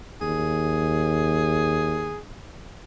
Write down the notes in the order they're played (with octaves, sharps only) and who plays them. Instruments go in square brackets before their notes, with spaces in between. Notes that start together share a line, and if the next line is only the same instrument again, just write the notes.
[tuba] D#2 [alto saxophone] G#4